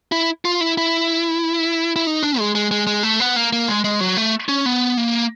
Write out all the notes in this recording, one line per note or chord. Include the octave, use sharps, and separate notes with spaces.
E4
F4
E4
E4
E4
D#4
D4
G#3
G#3
G#3
G#3
A3
B3
A#3
A#3
G#3
G#3
F#3
A3
C#4
B3
A#3